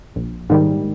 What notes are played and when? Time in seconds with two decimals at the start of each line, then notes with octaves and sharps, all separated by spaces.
0.16 A#1
0.50 G#2 D#3 G3